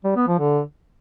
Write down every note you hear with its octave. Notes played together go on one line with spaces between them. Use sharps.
G3
B3
F3
D3